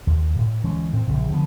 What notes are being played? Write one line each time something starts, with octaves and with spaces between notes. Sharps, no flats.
D#2
A2
D2 E3 G#3 C#4
A2 C4
A#1 F#2 C#3
D3 F3 G#3 B3